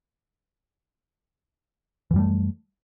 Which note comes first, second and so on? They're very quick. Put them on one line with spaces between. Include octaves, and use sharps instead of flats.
E3 F#2 G3 A3